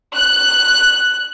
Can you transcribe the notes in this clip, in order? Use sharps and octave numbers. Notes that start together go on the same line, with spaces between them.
F#6